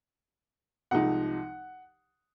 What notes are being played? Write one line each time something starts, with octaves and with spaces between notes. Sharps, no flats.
C2 C3 F3 G#3 D#4 F#5